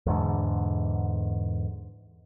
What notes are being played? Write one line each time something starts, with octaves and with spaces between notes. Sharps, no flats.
E2 G#2 D3